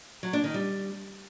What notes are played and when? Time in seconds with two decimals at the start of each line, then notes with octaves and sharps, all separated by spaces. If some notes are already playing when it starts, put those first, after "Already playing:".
0.23 F#3
0.33 D4
0.44 D#3
0.54 G3